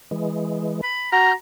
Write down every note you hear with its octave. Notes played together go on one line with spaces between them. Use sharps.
E3 G#3
B5
F#4 A#5 F6 G6